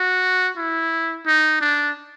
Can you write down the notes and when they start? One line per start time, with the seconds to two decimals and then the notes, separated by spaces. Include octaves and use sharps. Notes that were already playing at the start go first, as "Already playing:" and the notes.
Already playing: F#4
0.57 E4
1.26 D#4
1.61 D4